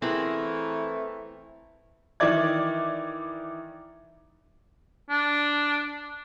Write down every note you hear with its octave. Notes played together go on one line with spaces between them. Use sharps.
E3 A3 C4 E4 G#4 A#4 F#5
D#3 E3 D#4 E4 D5 G#6
D4